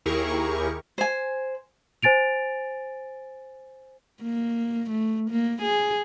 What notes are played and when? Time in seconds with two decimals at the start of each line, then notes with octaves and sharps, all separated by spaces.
0.06 D#2 E4 G4 G#4 A#4 C#6
0.98 C5 G#5
2.02 C5 G#5 A6 D7 F7
4.23 A#3
4.90 A3
5.30 A#3
5.62 G#4